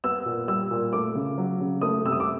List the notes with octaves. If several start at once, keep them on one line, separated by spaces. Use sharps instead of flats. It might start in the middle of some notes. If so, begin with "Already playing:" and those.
B3 E6
A#2
G3 E6
A#2
A3 D6
C#3
F#3
C#3
A3 D#6
C3 E6
D#6
D6